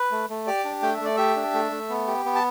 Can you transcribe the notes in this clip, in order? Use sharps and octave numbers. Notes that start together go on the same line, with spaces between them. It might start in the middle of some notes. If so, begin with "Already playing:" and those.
Already playing: B4
A3
A3
G4 D5
D4
A3 G5
E5
A3 D5
G4 E5
D4
A3
A3
B3
G4
B3
A5